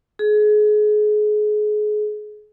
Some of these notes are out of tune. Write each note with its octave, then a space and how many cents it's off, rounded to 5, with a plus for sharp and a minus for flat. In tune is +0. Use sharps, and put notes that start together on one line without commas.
G#4 +30